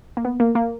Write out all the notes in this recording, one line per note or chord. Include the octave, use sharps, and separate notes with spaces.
A#3
B3
A#3
A#3